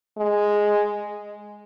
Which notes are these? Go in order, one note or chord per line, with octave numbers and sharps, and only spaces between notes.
G#3